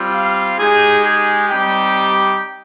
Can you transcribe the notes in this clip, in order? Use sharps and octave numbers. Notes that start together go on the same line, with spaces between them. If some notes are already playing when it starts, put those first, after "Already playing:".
Already playing: G3 C4 F4
F5
G#3 D#4 G4 G#4
G#4
G3 C4 D#4 G4 G5